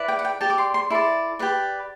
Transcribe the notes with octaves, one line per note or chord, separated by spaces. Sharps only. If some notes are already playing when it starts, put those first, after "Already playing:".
Already playing: E4 B4 D5
G5
F#5
G5
G4 D5 A5
D6
C6
C6
E4 A4 D5 C6
G4 B4 D5